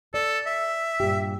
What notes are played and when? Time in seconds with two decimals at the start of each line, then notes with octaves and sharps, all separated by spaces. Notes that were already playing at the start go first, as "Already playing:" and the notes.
0.14 A4 D5
0.46 E5
1.00 G2 A#2 G4